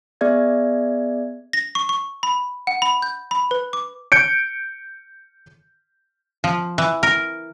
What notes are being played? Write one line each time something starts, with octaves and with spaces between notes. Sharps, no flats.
B3 G#4 D5 E5 G#6
A#6
C#6
C#6
B5
F#5
B5
G6
B5
B4
D6
G6 C#7 D7
F3
E3
A#4